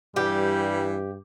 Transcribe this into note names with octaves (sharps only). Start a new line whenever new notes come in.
G2 E3 G3 G4